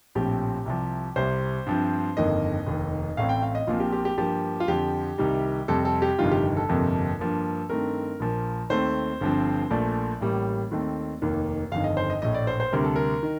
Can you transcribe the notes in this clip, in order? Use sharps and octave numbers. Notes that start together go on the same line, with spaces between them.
A#1 A2 F3 C4 G4
C2 C3 F3
C2 C3 G3 C5
G2 F3 C4
G1 F2 D#3 A#3 D#5
F1 D#2 D#3
A1 A2 A3 C4 F5
G5
F5
D#5
A#1 A#2 F3 C4 F4
G4
G4
G4
G2 F3 A#3 G4
F4
F2 D3 F3 G4
C2 C3 D#3 G3
F2 C3 G3 C4 A4
A4
G4
G1 F2 C3 D#3 G3 F4
G4
A4
G1 F2 C3 F3 A#3
G2 F3 A#3
G2 D#3 A3 C4 A#4
A#1 A#2 F3 A#3
D#2 D#3 A3 C4 C5
G1 G2 F3 C4
A#1 A#2 F3 A3 D5
A1 A2 G3 A#3
D#2 D#3 A3 C4
F1 D#2 D#3 A#3
G1 F2 D#3 F5
D#5
C5
D#5
A#1 A2 A3 D#5
D5
C5
C5
D2 C3 G3 A#4
A4
A#4
D#3